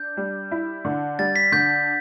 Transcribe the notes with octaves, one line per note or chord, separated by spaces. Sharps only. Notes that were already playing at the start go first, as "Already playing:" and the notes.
Already playing: D4 G6
G3
E4
D3
G3 A6
B6
D3 G6